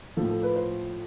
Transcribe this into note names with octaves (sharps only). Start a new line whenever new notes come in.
A2 F3 A4
A4
B4
C5